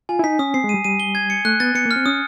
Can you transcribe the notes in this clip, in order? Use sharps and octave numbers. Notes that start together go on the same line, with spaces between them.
F4 G#5
E4
D#4 B6
C#4 D#6
C4 C7
G#3
G3 D#7
G3 D#7
G7
G#6
C#7
A3 F#6
B3 A6
B3 C#7
A#3
F6
C4
C#4 D#6